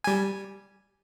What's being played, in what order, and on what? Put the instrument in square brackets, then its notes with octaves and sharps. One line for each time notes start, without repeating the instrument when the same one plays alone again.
[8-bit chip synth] G3 G#5